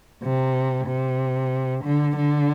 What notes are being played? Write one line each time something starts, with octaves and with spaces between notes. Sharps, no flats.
C3
C3
D3
D3